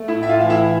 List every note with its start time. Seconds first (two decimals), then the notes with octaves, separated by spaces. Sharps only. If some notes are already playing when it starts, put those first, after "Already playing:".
Already playing: A3
0.08 E4 E5
0.16 A2
0.23 E5
0.29 F4 F5
0.40 E3 F5
0.50 E4 E5